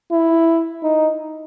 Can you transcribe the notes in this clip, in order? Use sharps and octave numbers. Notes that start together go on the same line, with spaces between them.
E4
D#4